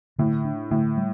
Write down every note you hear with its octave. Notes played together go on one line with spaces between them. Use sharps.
A2 D3
D4
A2 D3
G3